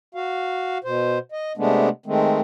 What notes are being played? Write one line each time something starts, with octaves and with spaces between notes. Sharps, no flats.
F#4 F5
B2 C5
D#5
C3 G#3 A3 B3 D4
D#3 G#3 A3 C4